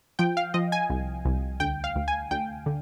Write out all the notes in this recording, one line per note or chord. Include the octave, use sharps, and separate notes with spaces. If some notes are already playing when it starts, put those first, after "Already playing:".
F3 G5
F5
F3 D#5
G#5
C2
C2
D2 G5
F5
D2
G#5
D2 G5
D3